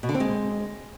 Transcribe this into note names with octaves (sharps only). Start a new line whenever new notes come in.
B2
D3
C4
G#3